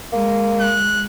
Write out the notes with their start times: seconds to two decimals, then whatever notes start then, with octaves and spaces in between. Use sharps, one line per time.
0.13 G#3 A#3
0.60 F#6